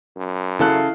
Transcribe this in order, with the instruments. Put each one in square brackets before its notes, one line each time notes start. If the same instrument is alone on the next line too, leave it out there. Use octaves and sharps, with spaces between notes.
[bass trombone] F#2
[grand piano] C#3 A4 F#6 [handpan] E4 F5